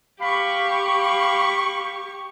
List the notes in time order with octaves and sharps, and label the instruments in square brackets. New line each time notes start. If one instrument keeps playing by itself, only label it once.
[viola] G4 C#6 [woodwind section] F5 B5